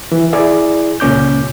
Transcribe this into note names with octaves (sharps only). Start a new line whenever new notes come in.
E3
E4 G#4 D5
C#2 A#2 C#4 D6 G6